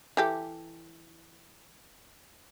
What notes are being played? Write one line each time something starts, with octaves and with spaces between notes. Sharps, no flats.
E3 G4 A4